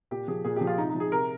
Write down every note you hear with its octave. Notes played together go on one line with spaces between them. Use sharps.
A#2 G4
F3 G#4
A#2 G#4
F3 G4
F4
C3 D#4
D#4
F3
G#4
C3 A#4